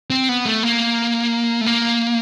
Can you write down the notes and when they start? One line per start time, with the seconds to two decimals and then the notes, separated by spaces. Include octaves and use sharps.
0.10 C4
0.29 B3
0.45 A3
0.63 A#3
1.61 A3
1.66 A#3